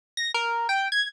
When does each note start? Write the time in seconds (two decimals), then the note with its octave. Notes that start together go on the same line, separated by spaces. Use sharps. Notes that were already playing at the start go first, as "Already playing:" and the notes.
0.17 A#6
0.34 A#4
0.69 G5
0.92 G#6